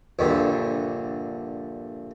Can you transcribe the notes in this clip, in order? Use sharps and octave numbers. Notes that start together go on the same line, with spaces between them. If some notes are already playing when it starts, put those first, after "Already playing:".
A#1 G2 D3